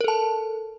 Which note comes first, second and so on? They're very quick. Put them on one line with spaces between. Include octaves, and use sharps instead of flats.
A#4 A4 A5